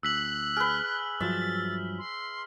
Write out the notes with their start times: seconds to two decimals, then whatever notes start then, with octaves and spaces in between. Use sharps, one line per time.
0.03 D2 E6 F#6 B6 F#7
0.57 G#4 B4 F6
1.20 G2 F3 F#3 E5 A6
1.99 C6